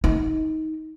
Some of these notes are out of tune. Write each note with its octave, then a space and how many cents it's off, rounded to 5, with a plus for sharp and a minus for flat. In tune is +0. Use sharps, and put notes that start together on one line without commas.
D#4 +20